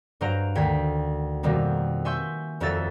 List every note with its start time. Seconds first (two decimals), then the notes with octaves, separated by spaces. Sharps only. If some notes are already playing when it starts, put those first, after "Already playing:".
0.21 G2 F#3 C5 F5 A#5 D7
0.55 D2 D#3 G5 G#6 B6
1.43 F2 B2 D#3 G3 A#3 C4
2.05 E5 G#5 C6 C#6 E6 G6
2.60 D#1 F2 F#3 A4 E5 A6